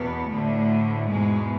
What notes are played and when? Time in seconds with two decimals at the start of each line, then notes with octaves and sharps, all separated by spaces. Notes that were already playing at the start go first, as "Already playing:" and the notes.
Already playing: E2 B2 B3
0.28 D2 A2 D3 A3
1.07 E2 G#2 B2 G#3